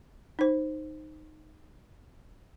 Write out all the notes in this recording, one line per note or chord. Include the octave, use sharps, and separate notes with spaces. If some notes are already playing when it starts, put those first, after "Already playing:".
D#4 C5